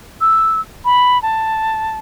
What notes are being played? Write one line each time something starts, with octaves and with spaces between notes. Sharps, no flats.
E6
B5
A5